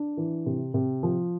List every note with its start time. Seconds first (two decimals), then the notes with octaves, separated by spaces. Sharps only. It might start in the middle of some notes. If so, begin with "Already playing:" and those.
Already playing: D4
0.17 E3
0.46 C3
0.74 C3
1.03 F3